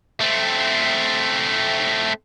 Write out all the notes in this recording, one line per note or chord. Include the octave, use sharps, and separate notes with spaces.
A3 C4